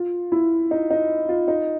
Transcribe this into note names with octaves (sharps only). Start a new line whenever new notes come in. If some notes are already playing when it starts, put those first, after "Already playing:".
Already playing: F4
E4
D#4
D#4
F4
D#4